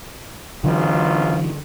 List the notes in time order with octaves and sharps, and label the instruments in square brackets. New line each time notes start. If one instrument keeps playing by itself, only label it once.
[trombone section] G#1 C#2 F4 [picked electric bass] D3 E3 F#3